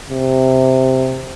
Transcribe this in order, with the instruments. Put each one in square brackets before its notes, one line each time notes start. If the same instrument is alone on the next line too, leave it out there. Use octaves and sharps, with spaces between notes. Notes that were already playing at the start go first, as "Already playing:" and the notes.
[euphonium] C3